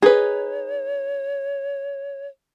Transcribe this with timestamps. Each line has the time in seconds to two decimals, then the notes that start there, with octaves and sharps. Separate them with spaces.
0.02 D#4 G#4 B4 C#5